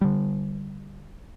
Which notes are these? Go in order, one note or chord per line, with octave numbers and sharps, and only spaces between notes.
D3 G3